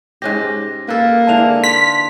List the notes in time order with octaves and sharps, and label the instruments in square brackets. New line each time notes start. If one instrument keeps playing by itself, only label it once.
[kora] G#2 C#4 G4 [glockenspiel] F#6 A#6
[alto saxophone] A#3 [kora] A4 B4
[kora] G#2 D3 E3 [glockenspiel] A5 F7
[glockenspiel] C6 [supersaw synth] B6